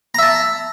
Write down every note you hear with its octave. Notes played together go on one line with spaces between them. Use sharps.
E5 A5 A#5